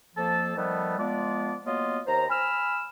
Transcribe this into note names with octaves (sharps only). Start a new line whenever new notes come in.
F2 F3 A#3 A4 A5
D#3 F3 G3 A3 B3
F3 G#3 B3 D5
F#3 A#3 B3 F4 D#5
D#2 C5 A#5
G#5 B5 E6 F6